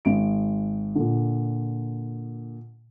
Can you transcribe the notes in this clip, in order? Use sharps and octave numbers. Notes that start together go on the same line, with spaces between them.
G#1 D7
A#2 D3